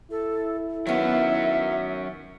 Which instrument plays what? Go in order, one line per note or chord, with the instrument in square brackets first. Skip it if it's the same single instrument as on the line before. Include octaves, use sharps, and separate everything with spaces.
[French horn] E4 [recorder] A4
[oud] D#3 B3 [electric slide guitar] F#3 C#4 F#4 [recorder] E5